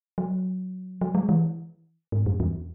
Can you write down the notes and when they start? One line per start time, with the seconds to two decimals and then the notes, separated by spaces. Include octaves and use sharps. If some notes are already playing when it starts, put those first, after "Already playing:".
0.18 F#3
1.01 F#3
1.15 G#3
1.29 E3
2.12 G#2
2.26 F#2
2.40 E2